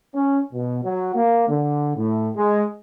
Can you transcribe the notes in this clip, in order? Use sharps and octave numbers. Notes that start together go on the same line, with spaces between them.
C#4
B2
F#3
A#3
D3
A2
G#3